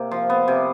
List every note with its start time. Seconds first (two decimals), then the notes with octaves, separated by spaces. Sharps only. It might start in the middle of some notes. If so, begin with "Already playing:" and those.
Already playing: C3 A#3
0.11 F3
0.30 B3
0.48 C3